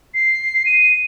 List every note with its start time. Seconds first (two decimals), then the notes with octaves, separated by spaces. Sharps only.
0.14 C7
0.66 D#7